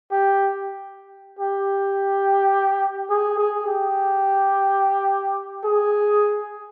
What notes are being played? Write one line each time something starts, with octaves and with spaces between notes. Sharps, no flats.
G4
G4
G#4
G#4
G4
G#4